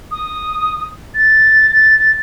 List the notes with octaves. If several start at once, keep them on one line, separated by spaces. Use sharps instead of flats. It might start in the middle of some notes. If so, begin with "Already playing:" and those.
D#6
A6